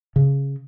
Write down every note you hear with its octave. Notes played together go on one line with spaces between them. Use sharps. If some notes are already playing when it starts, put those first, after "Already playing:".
C#3